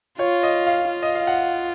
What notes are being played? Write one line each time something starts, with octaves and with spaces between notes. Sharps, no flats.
F4 C#5
D#5
F5
F4
D#5
F5
F#5